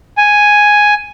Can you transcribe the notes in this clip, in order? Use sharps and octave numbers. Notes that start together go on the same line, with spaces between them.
G#5